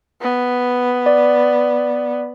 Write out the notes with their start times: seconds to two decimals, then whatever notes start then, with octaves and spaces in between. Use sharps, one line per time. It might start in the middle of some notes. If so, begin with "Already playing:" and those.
0.21 B3
1.06 D5